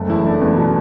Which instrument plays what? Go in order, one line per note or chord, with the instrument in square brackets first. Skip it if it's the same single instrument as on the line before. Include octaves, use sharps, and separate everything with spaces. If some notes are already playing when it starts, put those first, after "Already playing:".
Already playing: [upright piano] F#1 A3
E2 E4
A3 D4
E2 B3
B2